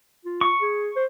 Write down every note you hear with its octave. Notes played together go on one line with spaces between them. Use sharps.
F4
C#6
G#4
C5